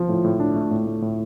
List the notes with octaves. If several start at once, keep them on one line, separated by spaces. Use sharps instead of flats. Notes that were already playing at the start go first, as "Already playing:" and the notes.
Already playing: F3 F4
A2
A2
D4
A3
A2
A3
A2